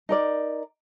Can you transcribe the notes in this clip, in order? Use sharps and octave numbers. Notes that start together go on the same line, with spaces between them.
D#4 A#4 D5